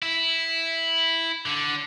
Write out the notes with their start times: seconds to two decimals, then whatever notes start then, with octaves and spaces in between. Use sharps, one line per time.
0.03 E4
1.46 D3